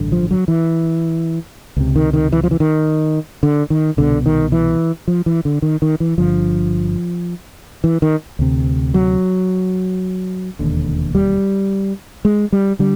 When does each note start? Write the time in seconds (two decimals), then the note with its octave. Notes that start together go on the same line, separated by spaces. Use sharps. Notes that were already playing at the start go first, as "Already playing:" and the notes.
Already playing: A1 G2 D3
0.12 F3
0.31 F#3
0.48 E3
1.77 C#2 C3
1.96 D#3
2.13 D#3
2.32 E3
2.44 F3
2.51 E3
2.60 D#3
3.43 D3
3.70 D#3
3.97 C2 B2 D3
4.26 D#3
4.52 E3
5.08 F3
5.26 E3
5.45 D3
5.62 D#3
5.82 D#3
6.00 E3
6.18 G1 G2 D3 F3
7.84 E3
8.02 D#3
8.39 D2 C3
8.94 F#3
10.59 E1 D#2 D3
11.15 G3
12.25 G#3
12.52 G3
12.79 D3 G3